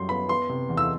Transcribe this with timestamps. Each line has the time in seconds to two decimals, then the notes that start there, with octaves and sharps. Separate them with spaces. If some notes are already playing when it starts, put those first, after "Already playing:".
Already playing: F#2 G3 C6
0.09 B3 B5
0.29 B3 C6
0.49 C3
0.69 E2
0.77 E6